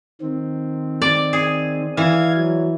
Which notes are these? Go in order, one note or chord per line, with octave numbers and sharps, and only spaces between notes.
D#3 C4
D5
G#4
E3 F5 G#6
F#3